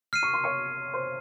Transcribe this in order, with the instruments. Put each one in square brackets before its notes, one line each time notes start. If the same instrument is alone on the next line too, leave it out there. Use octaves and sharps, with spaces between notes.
[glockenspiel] F6 C7 D#7
[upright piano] C#6
C6
C#5 C#6
C5 C6